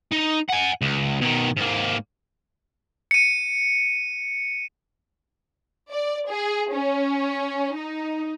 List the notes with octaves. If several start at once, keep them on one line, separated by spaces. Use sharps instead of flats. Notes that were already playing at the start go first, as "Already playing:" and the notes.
D#4
F#5 G#5
C#2
B2 D#3
G#2 A#3
C#7 D#7
D5
G#4
C#4
D#4